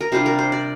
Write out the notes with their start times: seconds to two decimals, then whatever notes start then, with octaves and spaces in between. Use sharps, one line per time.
0.01 A#4
0.12 C3 G3 D4 F4 C5
0.26 A#4
0.39 C5
0.52 D5